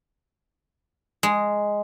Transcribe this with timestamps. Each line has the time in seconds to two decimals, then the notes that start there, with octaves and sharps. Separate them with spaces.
1.23 G#3